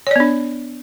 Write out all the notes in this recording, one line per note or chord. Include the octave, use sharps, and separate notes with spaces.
B3 D4 C#5 D5